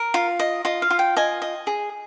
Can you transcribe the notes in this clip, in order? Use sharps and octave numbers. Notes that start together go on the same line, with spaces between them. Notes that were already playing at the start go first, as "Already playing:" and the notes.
Already playing: A#4
F4
D#5
F4 D#5
F5
F4
G5
D#5 G#5
D#5
G#4